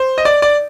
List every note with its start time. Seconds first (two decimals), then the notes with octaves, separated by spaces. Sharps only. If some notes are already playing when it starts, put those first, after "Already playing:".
Already playing: C5
0.18 D#5
0.25 D5
0.42 D5